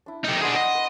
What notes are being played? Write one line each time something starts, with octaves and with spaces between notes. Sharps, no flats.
D4 E4
C3 D#4
B3 D4 G#4 C5 F#5
D#5
B4